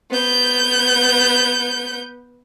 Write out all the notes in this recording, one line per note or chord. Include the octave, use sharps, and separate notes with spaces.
B3 G6